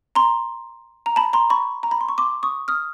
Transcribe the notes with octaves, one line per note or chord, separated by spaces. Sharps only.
A#5 C6
A#5
A5 B5
A#5 C6
B5 C#6
A#5
B5
C6
C#6
C6 D6
C#6 D#6
D#6 F6